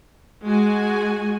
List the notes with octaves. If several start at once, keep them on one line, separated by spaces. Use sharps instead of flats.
G#3 F#4 G#5